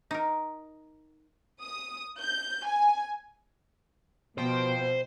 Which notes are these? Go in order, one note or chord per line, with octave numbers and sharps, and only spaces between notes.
D#4 A#4
D#6
G6
G#5
B2 F3 C5 G5